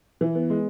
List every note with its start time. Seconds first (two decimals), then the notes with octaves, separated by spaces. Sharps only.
0.21 E3
0.35 B3
0.50 G#3